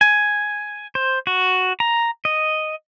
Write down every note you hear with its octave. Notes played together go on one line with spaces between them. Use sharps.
G#5
C5
F#4
A#5
D#5